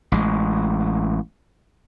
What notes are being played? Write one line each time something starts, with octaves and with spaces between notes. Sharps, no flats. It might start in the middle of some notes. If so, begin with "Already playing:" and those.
A1 G#3